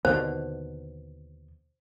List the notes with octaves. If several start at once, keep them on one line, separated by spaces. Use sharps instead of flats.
D#2 B2 D3 C5